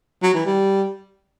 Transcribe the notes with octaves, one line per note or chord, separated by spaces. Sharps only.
F#3
E3
G3